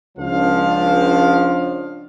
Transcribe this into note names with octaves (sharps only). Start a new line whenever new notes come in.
C#2 F3 D4 F5